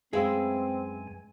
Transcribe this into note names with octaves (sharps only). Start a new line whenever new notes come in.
F#2 G#3 C4 G#4 B4 E5 F5 G#5